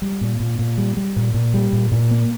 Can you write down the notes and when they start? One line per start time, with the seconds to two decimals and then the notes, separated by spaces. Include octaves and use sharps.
0.02 G3
0.21 A#2
0.40 A#2
0.59 A#2
0.78 G3
0.97 G3
1.16 A#2
1.34 A#2
1.54 G3
1.73 A#2
1.92 A#2
2.11 A#3